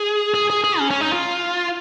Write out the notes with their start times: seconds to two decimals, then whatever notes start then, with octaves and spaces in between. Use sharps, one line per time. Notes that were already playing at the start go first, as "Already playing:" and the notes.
Already playing: G#4
0.34 G#4
0.50 G#4
0.64 G#4
0.79 C#4
0.91 C#4
1.01 D#4
1.13 F4